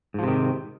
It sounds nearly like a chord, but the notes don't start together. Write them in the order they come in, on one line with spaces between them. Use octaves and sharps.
G#2 F3 C3 D#3